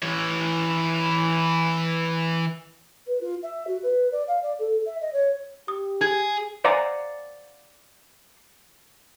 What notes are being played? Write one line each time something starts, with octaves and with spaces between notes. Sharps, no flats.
E3 C#5
B4
F4
E5
F#4
B4
D5
F5
D5
A4
E5
D#5
C#5
G4 D#6
G#4 G#6
C5 D5 F5 F#5 G#5 A#5